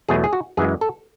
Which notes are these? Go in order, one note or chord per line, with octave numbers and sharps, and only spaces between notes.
E2 B2 F#3 A3 G#4
G#4
F#4
F#2 E3 G#3 G#4
A4